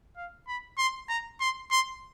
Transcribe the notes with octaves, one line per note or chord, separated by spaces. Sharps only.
F5
B5
C6
A#5
C6
C6